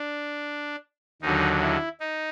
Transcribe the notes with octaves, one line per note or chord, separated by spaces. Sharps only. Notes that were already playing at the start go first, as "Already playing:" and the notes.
Already playing: D4
D#2 D3 F#3 D#4
E4
D#4